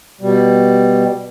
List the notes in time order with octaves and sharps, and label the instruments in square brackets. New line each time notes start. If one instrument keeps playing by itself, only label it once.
[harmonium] B2 G3